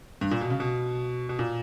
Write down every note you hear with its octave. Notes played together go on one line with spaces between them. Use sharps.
G2
A#2
B2
C#3
B2
B2
A#2